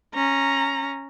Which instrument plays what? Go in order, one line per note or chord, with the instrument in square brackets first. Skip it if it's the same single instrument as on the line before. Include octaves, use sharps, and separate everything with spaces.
[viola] C#4 A#5